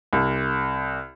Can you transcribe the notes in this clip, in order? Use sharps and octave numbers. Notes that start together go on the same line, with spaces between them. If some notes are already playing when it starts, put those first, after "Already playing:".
C2